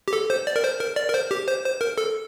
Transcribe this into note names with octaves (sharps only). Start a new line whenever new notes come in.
G4
A4
C5
D5
A#4
C5
A#4
D5
A#4
C5
G4
C5
C5
A#4
A4